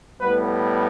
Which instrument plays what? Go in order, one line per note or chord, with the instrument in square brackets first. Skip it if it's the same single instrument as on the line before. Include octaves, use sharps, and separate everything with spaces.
[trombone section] A2 G3 B3 B4